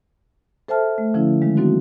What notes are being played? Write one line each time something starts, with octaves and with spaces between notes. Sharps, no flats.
A4 C5 E5 G5 A5 F6
A3
D3 F3 C#4 E4
D#3 G#3
F#3 A#3 C4 D#4 F#4